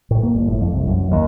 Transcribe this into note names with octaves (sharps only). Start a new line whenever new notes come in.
A2
A#3
G1
A2
F2
C2
F#2
D#2